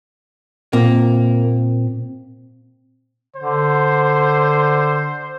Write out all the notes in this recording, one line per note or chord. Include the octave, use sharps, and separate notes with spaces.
A#2 A#3 C4
D3 C5